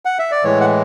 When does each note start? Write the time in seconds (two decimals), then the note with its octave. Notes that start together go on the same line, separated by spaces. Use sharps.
0.05 F#5
0.19 E5
0.31 D5
0.44 A2 E3 G#3 C#5
0.61 F#5